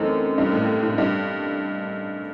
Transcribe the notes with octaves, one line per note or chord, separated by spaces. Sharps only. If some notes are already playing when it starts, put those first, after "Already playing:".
Already playing: F#2 E3 A3 C4 D#4
G2
A2
A2
G2